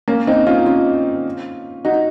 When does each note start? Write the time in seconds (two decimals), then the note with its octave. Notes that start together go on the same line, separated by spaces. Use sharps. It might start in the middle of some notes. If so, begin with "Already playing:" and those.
0.08 A#3 C#4
0.27 C4 D#4
0.47 C#4 F4
0.66 C#4 F4
1.85 D#4 F#4